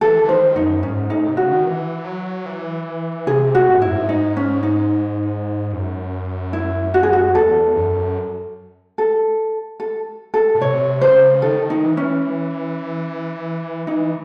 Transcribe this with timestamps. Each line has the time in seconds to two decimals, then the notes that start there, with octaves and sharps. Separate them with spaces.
0.01 E3 A4
0.24 E3
0.29 D#3 C5
0.56 F#2 D#4
0.83 G#2 C#4
1.10 A2 D#4
1.25 C3
1.37 C#3 F#4
1.52 D#3
1.65 E3
2.05 F#3
2.46 E3
3.27 C3 G#4
3.55 F#4
3.69 A2
3.77 G#2
3.82 F#2 E4
3.95 G#2
4.09 D#4
4.37 C#4
4.63 D#4
5.72 F#2
6.53 E4
6.94 F#4
7.03 G#4
7.13 F#4
7.34 E2 A4
7.76 F#2
8.98 A4
9.80 A4
10.34 A4
10.55 A2
10.61 C3 C#5
11.01 C#3 C5
11.42 D#3 A4
11.70 D#4
11.84 E3
11.97 C#4
13.87 E3 D#4